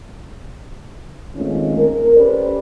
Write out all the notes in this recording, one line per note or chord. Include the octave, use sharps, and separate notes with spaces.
D#3 G#3 A3 C4 C#4 F4
A#4
C#4 G4 A4 B4 C5 D5